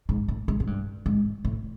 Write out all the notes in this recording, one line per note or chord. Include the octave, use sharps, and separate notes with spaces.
G#2
A2
G#2
G#2
G2
G#2
A2